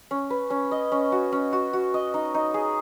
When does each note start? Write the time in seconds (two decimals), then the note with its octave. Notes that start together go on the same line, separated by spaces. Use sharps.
0.11 C#4
0.30 B4
0.50 C#4
0.71 D#5
0.92 C#4
1.12 F#4
1.32 C#4
1.53 F#4
1.73 F#4
1.94 D#5
2.14 D#4
2.34 D#4
2.54 G#4